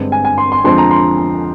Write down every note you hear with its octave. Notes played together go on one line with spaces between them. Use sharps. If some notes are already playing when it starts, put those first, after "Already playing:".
Already playing: G2 D3 G#3 C4
G#5
G#5
C6
C6
F2 D3 F3 G#3 C4 C6
A#5
C6